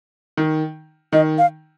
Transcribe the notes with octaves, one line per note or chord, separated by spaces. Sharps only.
D#3
D#3 D#5
F5